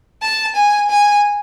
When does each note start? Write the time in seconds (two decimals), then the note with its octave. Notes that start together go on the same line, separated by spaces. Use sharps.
0.22 A5
0.55 G#5
0.90 G#5